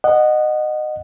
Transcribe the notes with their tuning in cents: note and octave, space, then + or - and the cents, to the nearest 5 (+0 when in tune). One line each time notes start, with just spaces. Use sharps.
D#5 -20 F#5 +0